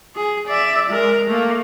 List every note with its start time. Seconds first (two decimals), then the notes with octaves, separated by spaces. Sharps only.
0.16 G#4
0.47 D5 E5
0.90 G#3 A#4
1.28 A3 A#3